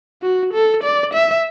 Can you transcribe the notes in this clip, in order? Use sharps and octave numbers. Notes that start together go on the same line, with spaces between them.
F#4
A4
D5
E5